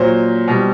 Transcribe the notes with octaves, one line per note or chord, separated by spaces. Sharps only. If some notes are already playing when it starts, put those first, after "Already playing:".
Already playing: A#2 F#3 C5
B2 G3